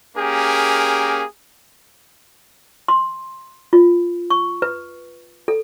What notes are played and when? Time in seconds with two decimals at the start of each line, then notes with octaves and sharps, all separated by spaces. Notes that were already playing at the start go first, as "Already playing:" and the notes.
0.17 A#3 C#4 G4 G#4 A#4
2.88 C6
3.73 F4
4.30 C#6
4.62 B4
5.48 A4